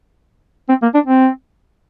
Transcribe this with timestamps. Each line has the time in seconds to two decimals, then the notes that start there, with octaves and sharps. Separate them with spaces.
0.69 C4
0.82 A#3
0.94 D4
1.06 C4